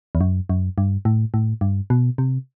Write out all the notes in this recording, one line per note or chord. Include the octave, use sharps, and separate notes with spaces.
E2
F#2
F#2
G2
A2
A2
G2
B2
C3